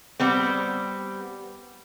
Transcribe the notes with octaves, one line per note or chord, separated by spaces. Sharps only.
G3 B3 C4